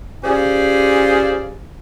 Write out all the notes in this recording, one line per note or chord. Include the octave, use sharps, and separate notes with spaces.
C#4 F4 G4 G#4 C5 D5